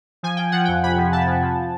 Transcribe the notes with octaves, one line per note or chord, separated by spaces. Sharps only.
F3 G#5
F3 G5
F3 F#5
F2 G5
C3 B5
F3
C3 A5
F3
F3